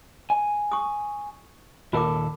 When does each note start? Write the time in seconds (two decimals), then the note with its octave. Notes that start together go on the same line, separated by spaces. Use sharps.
0.30 G#5
0.72 C#6 D#6
1.93 D#2 A#2 F4 A4 A#4 D6